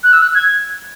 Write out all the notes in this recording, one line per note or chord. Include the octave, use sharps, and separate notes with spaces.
F#6
E6
F#6
G#6